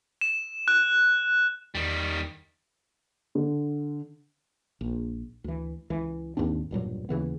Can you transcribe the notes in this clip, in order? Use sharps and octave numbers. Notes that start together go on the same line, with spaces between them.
E7
F#6
E2 D#3 G3
D3
A#1
D2 E3
C#2 E3
D#2 G#2 C4 D4
E1 G2 A#2 F#3
D#2 C#3 E3 B3